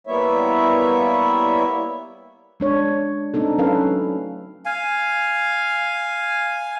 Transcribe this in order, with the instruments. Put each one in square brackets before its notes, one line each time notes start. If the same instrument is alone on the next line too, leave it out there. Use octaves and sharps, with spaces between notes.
[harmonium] G3 A#3 B3 E4 C#5 E5
[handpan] G#3 D4 C#5
A3 C4 D4 D#4 A4
F#3 C#4 A4 B4 F5
[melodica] F5 G#5